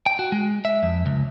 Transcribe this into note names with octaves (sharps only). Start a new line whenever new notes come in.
G5
F#4
G#3
E5
F2
C#2